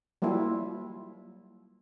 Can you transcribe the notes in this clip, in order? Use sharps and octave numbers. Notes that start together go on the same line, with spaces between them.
F#3 G3 A#3 E4 F4